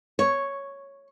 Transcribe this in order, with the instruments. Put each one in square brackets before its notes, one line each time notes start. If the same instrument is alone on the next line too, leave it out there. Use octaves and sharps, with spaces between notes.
[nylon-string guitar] C#5